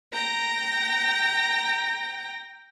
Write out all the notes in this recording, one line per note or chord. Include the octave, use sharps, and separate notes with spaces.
G5 A#5 A#6